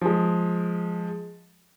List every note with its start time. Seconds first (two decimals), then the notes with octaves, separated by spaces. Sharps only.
0.02 F3 G#3